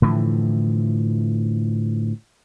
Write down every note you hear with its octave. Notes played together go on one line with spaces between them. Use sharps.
A2 D3 E3 F3